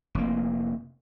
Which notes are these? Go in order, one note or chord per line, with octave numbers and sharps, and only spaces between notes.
F1 A#3